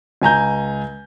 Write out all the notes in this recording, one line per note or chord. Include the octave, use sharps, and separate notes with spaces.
C#2 G#5 A#5 G6